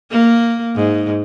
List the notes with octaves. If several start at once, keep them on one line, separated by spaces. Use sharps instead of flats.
A#3
G#2